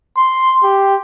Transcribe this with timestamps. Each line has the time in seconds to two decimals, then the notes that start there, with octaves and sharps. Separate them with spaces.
0.17 C6
0.63 G4